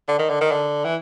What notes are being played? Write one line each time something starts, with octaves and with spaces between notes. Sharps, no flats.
D3
D#3
D3
D#3
D3
E3